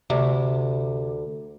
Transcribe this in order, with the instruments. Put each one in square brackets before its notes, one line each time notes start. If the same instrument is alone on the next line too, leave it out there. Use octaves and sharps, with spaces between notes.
[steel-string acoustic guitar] D2 [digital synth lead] C3